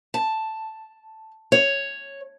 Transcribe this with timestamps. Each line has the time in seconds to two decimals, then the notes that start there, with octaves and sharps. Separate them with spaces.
0.14 A5
1.52 C#5